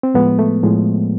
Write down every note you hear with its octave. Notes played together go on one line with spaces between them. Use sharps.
C4
A2 F3 G#3 B3
A3
A2 F3 G#3